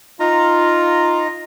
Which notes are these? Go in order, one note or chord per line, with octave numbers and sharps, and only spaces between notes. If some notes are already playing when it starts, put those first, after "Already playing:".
D#4 F4 A#5